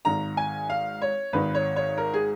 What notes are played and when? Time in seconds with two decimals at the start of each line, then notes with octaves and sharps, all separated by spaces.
0.05 G#1 G#2 D#3 A#5
0.37 G#5
0.70 F5
1.02 C#5
1.33 G#1 G#2 D#3 B4
1.55 C#5
1.76 C#5
1.98 A#4
2.14 G#4